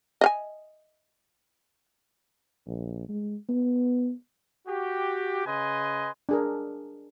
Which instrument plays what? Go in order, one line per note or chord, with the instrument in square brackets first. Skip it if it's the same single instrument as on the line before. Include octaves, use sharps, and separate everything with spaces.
[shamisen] D#5 F5 G#5
[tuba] A#1
G#3
B3
[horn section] F#4 G4
C#3 B4 D#5 G#5 C6
[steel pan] D4 G#4 A#4